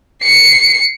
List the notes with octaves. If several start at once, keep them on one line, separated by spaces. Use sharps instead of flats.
C7 C#7